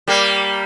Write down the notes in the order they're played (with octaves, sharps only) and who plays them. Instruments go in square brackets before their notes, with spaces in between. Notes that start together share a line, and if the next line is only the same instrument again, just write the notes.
[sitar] G3 A#3